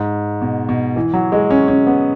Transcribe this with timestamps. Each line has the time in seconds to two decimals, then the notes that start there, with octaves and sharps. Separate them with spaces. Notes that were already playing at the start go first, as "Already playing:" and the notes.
Already playing: G#2
0.41 B2
0.69 B2
0.96 E3
1.14 F#3
1.32 G#3
1.50 C#4
1.68 C#4
1.87 B3